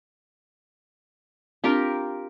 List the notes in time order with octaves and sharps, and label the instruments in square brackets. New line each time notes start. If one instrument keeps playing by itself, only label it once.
[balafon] C4 D4 [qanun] F4 G4 A#4